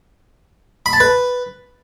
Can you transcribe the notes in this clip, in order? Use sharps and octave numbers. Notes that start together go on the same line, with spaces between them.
B5
A5
B4